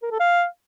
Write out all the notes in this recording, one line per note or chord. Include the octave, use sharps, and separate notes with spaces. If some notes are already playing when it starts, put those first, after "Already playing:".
A#4
A4
F5